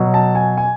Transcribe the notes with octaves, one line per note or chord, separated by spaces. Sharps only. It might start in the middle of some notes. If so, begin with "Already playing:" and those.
Already playing: B2 F#3
A5
G#5
G#5